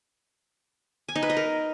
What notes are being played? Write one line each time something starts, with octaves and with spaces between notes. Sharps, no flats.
G#5
D#4
B4
D#5
A#4